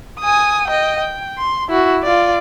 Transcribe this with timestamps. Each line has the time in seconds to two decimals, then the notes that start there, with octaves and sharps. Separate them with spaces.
0.20 G#5 D#6
0.68 D#5 G5
0.99 G5
1.39 C6
1.69 E4 F#4
2.03 F4 D5